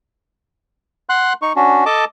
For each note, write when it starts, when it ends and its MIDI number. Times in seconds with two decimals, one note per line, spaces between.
1.09 1.33 78
1.09 1.33 84
1.09 1.33 90
1.42 1.53 63
1.42 1.53 85
1.56 1.84 61
1.56 1.84 62
1.56 1.84 66
1.86 2.05 69
1.86 2.05 75
1.86 2.05 81
1.86 2.05 86